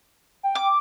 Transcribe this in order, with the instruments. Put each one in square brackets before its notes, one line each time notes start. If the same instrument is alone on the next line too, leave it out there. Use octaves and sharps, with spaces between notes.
[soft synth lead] G5
[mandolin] D6